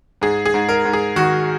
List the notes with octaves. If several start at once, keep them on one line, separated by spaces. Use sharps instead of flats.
G#2 G#4
G#4
G#2
A#4
G#2
G#4
D#3 F#4